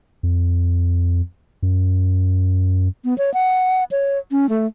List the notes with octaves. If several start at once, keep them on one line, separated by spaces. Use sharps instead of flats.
F2
F#2
B3
C#5
F#5
C#5
C#4
A3